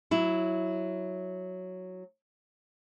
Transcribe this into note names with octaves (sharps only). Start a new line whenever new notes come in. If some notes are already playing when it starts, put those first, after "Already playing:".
F#3 E4